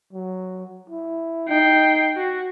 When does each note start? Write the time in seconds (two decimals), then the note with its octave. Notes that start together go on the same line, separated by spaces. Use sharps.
0.13 F#3
0.90 E4
1.49 D#4 G5 C7
2.17 F#4